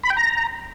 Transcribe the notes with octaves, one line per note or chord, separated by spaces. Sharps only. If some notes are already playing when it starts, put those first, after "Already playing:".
B5
G5
A#5